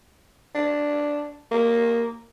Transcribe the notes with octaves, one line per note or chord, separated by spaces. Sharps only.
D4
A#3